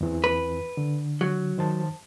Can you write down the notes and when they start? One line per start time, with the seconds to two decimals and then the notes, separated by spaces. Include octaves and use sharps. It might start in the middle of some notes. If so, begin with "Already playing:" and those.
0.01 E2 E3 C4
0.24 B4
0.77 D3
1.21 F#3
1.58 D#3 C5 A5